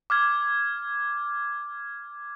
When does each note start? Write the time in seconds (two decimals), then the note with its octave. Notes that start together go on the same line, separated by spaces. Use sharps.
0.10 D6 F6 G#6